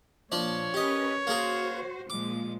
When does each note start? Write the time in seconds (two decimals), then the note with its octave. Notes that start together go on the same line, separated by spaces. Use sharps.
0.32 A#2 F3 D4 C#5 D5
0.74 C#4 G4 A#4 B4 D#5
1.27 A#3 F#4 G#4 A#4 C5
2.10 A#2 F3 G#3 D6